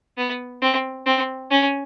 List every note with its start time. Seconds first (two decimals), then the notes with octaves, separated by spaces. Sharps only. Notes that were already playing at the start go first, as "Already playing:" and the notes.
0.17 B3
0.62 C4
1.06 C4
1.50 C#4